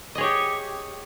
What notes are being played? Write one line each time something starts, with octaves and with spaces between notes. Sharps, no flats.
G4 G#4 C#5 D#5